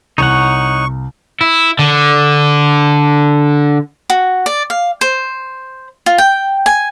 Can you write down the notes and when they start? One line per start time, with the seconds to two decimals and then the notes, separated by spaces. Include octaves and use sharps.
0.18 C2 D#4 C#5 F#5 C#6
1.41 E4
1.79 D3
4.10 F#4
4.46 D5
4.70 F5
5.01 C5
6.06 F4
6.18 G5
6.66 G#5